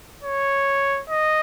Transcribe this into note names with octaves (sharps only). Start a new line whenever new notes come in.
C#5
D#5